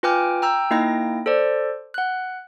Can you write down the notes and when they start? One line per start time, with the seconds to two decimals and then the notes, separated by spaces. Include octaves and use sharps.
0.03 F4 B4 G5 G#5 D6 F6
0.42 G5 A#5 E6 G6
0.71 A#3 D#4 E4 D#5 G5 A#6
1.26 A4 C5 D5
1.94 F#5 F#6